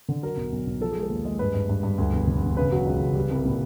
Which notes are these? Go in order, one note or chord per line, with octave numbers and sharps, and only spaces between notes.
D3
F#3 A#4
B1
B1
B1
F3 A4
G#3 G#4
A4
D#2
G#3
G2 B4
G2
G2
G2
D2
E1
D3
E1
C#3 B4
F#3
C#2
C#3
G3
C2
A#2